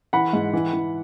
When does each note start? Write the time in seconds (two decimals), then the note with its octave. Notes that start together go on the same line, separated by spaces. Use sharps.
0.13 E3 F#5 B5
0.33 G#2
0.53 E3
0.73 E3